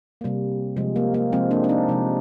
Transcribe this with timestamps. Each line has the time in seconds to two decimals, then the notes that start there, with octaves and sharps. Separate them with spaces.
0.21 C3 G3 A#3
0.76 C3 F3 G#3
0.96 A#3
1.14 A#3
1.32 C3 F3 G#3 C4
1.51 A#3 D4
1.64 D4
1.69 C4 D#4
1.89 C3 F3 G#3